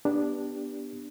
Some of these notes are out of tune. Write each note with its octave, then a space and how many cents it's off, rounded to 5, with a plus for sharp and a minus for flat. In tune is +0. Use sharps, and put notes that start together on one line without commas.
B3 -15 D4 +0 G4 +0